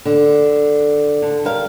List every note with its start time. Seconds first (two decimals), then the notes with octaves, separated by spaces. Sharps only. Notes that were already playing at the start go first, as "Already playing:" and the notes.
0.05 D3
1.22 D3
1.45 G3 A#4 F5